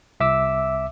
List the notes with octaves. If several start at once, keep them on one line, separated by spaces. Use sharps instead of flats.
C2 E5 D6 E6